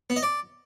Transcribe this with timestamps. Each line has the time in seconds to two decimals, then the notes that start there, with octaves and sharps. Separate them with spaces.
0.10 B3
0.16 D#5
0.23 D5